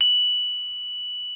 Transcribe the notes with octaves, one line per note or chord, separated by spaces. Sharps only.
F#7